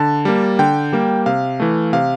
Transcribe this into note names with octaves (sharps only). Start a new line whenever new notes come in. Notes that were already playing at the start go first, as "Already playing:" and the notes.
Already playing: D3 A5
G3 A#3
D3 G5
G3 A#3
C3 F5
E3 A3
C3 F5